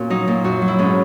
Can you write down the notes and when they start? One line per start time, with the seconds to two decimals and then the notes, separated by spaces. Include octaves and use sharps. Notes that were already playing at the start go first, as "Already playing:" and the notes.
Already playing: A#2 C#4 F#4
0.10 F#3 D#4
0.28 A#2
0.44 F#2 F#4
0.62 F#3
0.68 E4
0.79 G#2 C#4